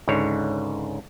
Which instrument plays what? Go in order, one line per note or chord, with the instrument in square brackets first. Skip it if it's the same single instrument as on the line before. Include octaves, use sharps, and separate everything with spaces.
[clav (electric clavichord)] C#2 G#2 D3 C#5